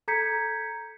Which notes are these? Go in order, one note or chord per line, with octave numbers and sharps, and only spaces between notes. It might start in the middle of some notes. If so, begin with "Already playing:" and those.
A4 A#5 G6 G#6 B6 C#7